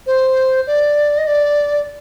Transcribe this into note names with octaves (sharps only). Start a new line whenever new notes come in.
C5
D5
D#5
D5